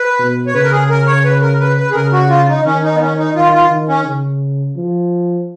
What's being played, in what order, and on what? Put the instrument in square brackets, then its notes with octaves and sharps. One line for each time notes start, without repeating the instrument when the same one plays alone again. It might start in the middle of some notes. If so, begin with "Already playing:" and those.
Already playing: [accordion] B4
[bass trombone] B2
[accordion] C#5
[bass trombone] C#3 [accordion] B4
[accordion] A#4
G#4
A#4
C#5
B4
A#4
B4
B4
G#4
[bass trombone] C#3 [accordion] A#4
[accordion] F#4
F4
D#4
[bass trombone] D#3 [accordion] C#4
[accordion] D#4
B3
C#4
D#4
[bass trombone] D#3 [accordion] F4
[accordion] F4
[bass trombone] D#3
[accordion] C#4
[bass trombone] C#3
F3